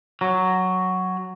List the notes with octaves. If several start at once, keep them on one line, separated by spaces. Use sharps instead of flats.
F#3